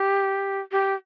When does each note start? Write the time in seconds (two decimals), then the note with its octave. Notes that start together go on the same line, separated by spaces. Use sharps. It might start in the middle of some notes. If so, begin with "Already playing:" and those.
Already playing: G4
0.72 G4